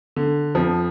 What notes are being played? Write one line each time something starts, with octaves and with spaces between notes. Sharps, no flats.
D3
F2 F3